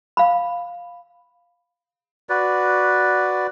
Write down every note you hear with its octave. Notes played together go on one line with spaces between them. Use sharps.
F5 B5
F#4 B4 D5